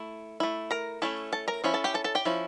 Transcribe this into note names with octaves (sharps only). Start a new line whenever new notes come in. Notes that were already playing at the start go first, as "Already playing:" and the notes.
Already playing: A3 E4
A3 E4
A#4 A#5
A3 C#4 E4 A4 A5
A4 A5
A#4 A#5
F3 C#4 E4
A4 A5
G4 G5
A4 A5
A4 A5
G4 G5
F3 C#4 E4